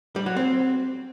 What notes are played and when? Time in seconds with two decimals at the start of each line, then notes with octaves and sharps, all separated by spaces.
0.16 G3
0.26 F#3
0.36 C4